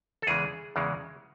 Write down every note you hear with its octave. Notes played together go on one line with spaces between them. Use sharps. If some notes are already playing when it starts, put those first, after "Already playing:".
A4
E2 C#3 E3 G#3 G#4
E2 C#3 E3 G#3